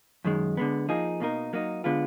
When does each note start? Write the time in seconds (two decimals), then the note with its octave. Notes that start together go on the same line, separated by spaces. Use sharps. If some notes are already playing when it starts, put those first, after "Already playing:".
0.25 F#2 D#3 G#3
0.57 D3 G#3 B3
0.89 F3 A#3 D#4 G#4
1.20 B2 A#3 D#4 A#4
1.53 F#3 A#3 D#4
1.84 D3 G#3 B3 F4